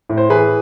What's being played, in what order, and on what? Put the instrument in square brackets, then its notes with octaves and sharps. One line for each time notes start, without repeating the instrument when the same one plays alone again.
[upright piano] A2
C5
E3 G#4 B4